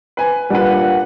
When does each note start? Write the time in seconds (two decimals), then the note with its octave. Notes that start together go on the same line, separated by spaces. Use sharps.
0.17 B4 G#5
0.50 A#2 G3 D4 B4 F#5